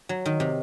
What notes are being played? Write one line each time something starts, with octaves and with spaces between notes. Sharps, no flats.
F#3
D#3
C3